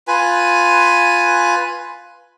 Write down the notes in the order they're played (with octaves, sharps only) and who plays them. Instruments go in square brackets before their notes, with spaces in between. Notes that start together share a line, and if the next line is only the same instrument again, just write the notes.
[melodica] F4 B4 G#5